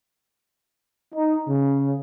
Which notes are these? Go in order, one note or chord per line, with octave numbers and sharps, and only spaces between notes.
D#4
C#3